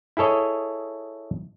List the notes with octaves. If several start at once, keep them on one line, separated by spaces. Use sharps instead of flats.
E4 G#4 A4 C#5 D#5